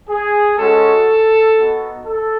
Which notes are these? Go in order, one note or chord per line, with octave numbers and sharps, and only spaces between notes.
G#4
G#3 C#4 F#4 A4
B3 D#4 F#4
A4